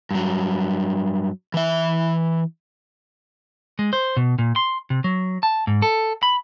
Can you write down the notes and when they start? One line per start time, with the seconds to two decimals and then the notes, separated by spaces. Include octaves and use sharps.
0.11 G2 F#3
1.54 E3 E5
3.79 G#3
3.93 C5
4.17 B2
4.39 A#2
4.56 C6
4.90 C3
5.04 F#3
5.43 A5
5.67 G#2
5.82 A4
6.23 B5